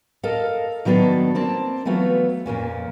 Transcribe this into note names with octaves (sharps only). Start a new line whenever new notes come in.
A4 A#4 D#5 F5
D#3 F#3 B3 D4 A4
A#3 C4 A5
E3 F#3 A3 B3 F4
F2 A#2 A#3 C#4